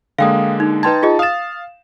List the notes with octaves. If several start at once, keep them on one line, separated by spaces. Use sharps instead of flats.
D3 G#3 A#3 F5 G5 D#6
D#4
D#4 B4 G5 A5 C6 G#6
F4 G#4 D#5
F5 D#6 A6 E7